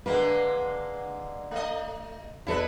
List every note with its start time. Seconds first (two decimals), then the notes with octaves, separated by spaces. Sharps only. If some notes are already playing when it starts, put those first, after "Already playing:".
0.06 D3 G#3 A#3 B4
1.51 A3 D#5
2.47 E2 E4 A4 B4 D#5